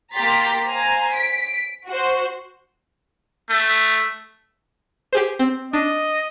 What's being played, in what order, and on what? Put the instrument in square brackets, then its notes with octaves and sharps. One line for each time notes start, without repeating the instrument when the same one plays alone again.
[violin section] A#3 G4 A#5 C6 A6 B6
C5 F5 G#5 A#5
B6 D7
F#4 C5
[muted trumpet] A3
[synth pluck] G4 G#4 C5
C4
[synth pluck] D4 [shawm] D#5